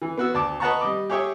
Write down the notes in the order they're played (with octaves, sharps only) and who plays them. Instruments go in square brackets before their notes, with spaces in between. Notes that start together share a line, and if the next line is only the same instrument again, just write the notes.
[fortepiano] E3
B3 F#4 E6
D2 A5 D6
B4 D#5 F#5 A5 A#5 C#6
G3 D#5 D6
G4 G#4 C#5 E5 G5